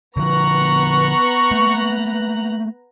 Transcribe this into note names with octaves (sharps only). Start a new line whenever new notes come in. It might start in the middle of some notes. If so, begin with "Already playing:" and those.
D3 F3 B3 A#5 C#6 F#6
A3 A#3